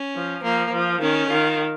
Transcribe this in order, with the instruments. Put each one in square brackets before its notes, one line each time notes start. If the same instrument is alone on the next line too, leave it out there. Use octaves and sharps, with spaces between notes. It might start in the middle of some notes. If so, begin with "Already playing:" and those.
Already playing: [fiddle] C#4
[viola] F3
[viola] F3 [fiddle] A#3
[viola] F3
[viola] D#3 [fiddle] C#4
[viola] D#3 [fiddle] F4